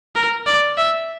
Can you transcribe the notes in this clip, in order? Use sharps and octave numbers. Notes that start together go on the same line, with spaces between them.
A#4
D5
E5